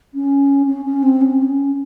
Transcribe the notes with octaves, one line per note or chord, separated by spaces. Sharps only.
C#4
C#4
C#4
C4
C#4
C4
C#4